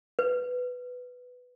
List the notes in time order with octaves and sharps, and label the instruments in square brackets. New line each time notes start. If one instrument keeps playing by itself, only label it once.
[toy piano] B4